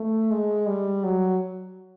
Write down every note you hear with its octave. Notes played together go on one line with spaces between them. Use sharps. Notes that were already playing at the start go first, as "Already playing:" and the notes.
Already playing: A3
G#3
G3
F#3